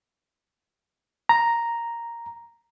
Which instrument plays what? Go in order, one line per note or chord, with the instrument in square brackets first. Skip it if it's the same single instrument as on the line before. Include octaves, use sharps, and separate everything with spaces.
[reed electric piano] A#5